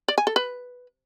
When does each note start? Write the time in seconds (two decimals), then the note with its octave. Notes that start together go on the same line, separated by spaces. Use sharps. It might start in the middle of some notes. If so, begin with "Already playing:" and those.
0.08 D5
0.18 G#5
0.27 A4
0.36 B4